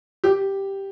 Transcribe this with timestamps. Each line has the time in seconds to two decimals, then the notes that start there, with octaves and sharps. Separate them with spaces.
0.24 G4